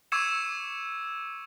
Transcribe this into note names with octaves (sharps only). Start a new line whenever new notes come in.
C#6 D6 E6 G#6 C#7 E7